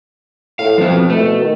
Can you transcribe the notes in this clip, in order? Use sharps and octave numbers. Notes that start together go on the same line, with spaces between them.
A2 F5
B2 F3 C4
E3 A3
B2
D#3